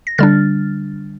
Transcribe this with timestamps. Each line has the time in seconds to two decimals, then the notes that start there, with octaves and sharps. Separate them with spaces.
0.07 A#6
0.18 D3 G3 D4 F6 A6